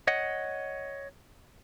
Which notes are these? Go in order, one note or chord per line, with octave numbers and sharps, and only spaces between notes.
C#5 D#5 F#5